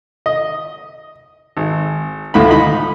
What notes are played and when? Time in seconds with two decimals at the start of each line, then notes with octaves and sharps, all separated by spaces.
0.26 D#5
1.57 G#1
2.34 D2 A2 E4 F4 B5
2.49 D#4 D#5 B5